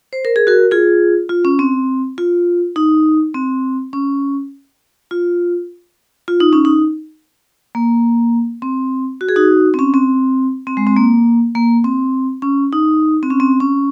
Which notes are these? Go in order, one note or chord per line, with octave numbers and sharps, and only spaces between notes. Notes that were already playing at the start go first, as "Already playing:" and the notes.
C5
A#4
G#4
F#4 A#4
F4 G#4
F4
C#4
C4
F4
D#4
C4
C#4
F4
F4
D#4
C#4
D#4
A#3
C4
F#4
G#4
D#4 F#4
C4
C#4
C4
C4
G#3
C4
A#3
A#3
C4
C#4
D#4
C4
C#4
C4
C#4